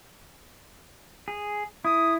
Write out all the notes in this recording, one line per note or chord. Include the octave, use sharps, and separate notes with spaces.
G#4
E4 D#6